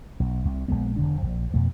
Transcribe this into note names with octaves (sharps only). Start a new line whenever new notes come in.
B1
C2
A#1 G2 G#3 B3
E1 D3 D4
A#1 F2
F2 B2 A3